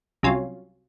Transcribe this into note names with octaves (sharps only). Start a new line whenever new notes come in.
C2 C3 F#3 C#4 F4